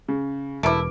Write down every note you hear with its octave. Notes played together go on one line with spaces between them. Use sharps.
C#3
E1 A3 E4 A#4 B4 D6 D7